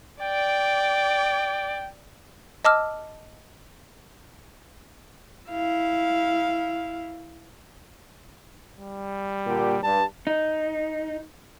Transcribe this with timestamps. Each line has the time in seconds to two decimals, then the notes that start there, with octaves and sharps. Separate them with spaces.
0.22 D5 G5
2.65 D#5 A5 D6 E6 F6
5.50 E4 F5
8.78 G3
9.47 A#2 D3 G4
9.83 G2 A5
10.27 D#4